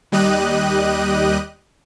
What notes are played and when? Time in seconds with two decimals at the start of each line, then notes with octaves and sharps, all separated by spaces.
0.12 D#2 G3 G4 D#5 F#6 D#7